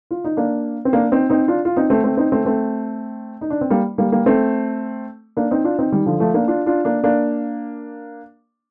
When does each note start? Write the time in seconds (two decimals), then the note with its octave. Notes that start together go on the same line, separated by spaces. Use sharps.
0.11 F4
0.24 D#4
0.37 A#3 D4
0.85 C4
0.93 A#3 D4
1.12 C4 D#4
1.30 C4 D#4
1.48 D4 F4
1.65 F4
1.77 C4 D#4
1.90 A3 C4
2.04 A3 C4
2.17 C4 D#4
2.32 A3 C4
2.45 A3 C4
3.41 D#4
3.50 D4
3.61 C4
3.70 G3 A#3
3.98 G3 A#3
4.12 G3 A#3
4.26 A3 C4
5.37 A#3 D4
5.51 C4 D#4
5.64 D4 F4
5.79 C4 D#4
5.92 D#3 G3
6.06 D3 F3
6.20 F3 A3
6.34 A#3 D4
6.47 D4 F4
6.66 D4 F4
6.85 A#3 D4
7.04 A#3 D4